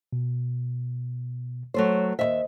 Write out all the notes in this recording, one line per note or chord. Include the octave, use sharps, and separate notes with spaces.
B2
F#3 A3 C5 C#5
D#2 A#2 C5 D#5 E5